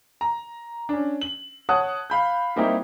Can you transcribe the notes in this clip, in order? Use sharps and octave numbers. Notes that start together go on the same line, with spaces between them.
A#5
C#4 D4
F#7
C#5 F#5 A5 D#6 F#6
F5 B5 G6
G3 A#3 C4 D#4 E4 G4